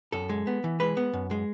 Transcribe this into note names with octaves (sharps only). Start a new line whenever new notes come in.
F#2 A4
G#3
B3
E3
G#3 B4
B3
F#2
G#3